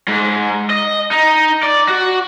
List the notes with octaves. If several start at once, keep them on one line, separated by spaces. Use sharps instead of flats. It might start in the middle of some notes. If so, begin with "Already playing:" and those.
G#2
D#5
D#4
D5
F#4